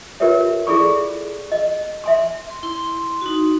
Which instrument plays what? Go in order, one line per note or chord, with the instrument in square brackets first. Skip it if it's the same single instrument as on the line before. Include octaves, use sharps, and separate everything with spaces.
[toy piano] F4 G4 A#4 B4 C#5 E5
E4 G#4 A4 D5 B5 C#6
D#5
E5 G#5 C6
[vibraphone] C6
E4 C6
D#4 F#4